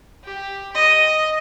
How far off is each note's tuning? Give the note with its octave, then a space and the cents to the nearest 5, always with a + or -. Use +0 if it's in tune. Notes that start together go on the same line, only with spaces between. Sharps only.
G4 +5
D#5 +0